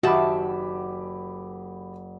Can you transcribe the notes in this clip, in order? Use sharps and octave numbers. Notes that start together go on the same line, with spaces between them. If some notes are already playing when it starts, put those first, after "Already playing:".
F#1 D#3 F#4 G4 E5 A5 B5 D6